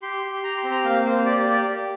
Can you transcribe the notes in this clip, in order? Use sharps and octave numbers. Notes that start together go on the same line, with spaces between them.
G4 C6
G4
G4 A#5
C6
C4
A#5
A#3 F5
A#3 C5
G4 D5
D5
G4
D5
G4